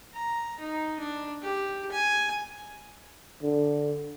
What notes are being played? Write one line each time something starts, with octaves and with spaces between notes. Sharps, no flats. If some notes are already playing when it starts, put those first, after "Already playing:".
A#5
D#4
D4
G4
G#5
D3